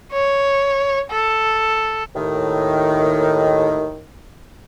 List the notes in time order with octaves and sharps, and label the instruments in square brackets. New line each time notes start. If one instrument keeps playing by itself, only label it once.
[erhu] C#5
A4
[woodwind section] D#2 A2 D#3